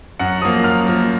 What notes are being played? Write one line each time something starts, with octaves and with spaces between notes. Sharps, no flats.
F#2 F#5
F3 A#3 D#6
F#2 F6
F3 A#3